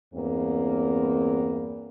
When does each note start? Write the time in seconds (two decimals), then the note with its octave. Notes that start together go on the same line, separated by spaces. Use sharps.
0.14 E2 G2 A#3 C4